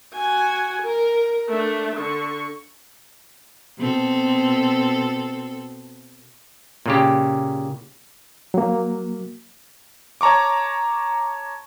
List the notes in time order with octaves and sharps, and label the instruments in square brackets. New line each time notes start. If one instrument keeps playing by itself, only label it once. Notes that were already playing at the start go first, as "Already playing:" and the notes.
[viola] F#4 G#5
A#4
A3 D4
D3 C#6
[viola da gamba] B2 C4 A4
[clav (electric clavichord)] A#2 C#3 G4
[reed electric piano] F#3 A#3
[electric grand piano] C#5 A5 A#5 C#6 D6